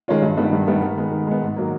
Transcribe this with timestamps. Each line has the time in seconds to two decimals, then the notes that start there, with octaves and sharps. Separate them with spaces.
0.08 D#3 G#3 C#4 F4
0.22 G2
0.37 D#3 G3 B3
0.53 G2
0.67 D#3 G3 B3
0.82 D#3
0.97 G#3 B3
1.12 D#3
1.27 G#3 B3
1.42 G#2
1.56 D#3 F#3 A#3